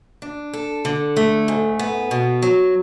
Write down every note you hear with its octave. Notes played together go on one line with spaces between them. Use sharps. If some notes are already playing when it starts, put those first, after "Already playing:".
D4
A4
D3
A3
G#2
B3
B2
F#3